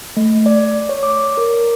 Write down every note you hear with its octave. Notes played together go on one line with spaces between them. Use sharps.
A3
D5
C#5
D6
A#4